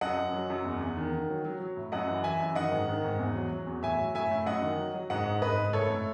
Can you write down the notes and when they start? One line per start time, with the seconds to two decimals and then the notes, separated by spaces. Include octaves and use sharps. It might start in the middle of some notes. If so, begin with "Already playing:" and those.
0.01 F#2 D#5 F#5
0.17 F#2
0.33 F#3
0.50 F#2
0.65 E2
0.81 E2
0.97 D#3
1.13 D#3
1.29 F#3
1.45 F#3
1.60 F#3
1.77 A2
1.92 F#2 D#5 F#5
2.08 E3
2.24 E3 E5 G#5
2.40 F#2
2.55 D#3 D#5 F#5
2.72 G#2
2.88 D#3
3.04 G#2
3.19 E2
3.35 F#3
3.52 F#3
3.67 E2
3.83 A2 E5 G#5
3.98 F#3
4.15 A2 E5 G#5
4.31 A2
4.46 F#2 D#5 F#5
4.62 D#3
4.78 F#3
4.94 F#3
5.10 G#2 D#5 F#5
5.26 G#2
5.42 G#2 B4 D#5
5.59 G#2
5.73 A2 A4 C#5
5.90 A2